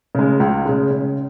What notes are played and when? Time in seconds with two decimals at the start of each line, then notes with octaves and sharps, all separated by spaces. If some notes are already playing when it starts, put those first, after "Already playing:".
0.15 C#3 G#3
0.40 C#2
0.66 C#3 G#3
0.91 C#3